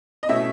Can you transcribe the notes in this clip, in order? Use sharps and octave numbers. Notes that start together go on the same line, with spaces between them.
D#5
B2 A3 C#4 E4 E5